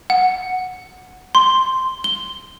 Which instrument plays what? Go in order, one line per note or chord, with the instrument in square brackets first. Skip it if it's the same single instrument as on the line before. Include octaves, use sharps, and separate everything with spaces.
[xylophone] F#5
C6
G7